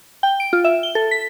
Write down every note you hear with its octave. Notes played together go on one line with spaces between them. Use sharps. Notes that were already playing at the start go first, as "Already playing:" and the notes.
G5
D7
F4
E5
G7
A4
B6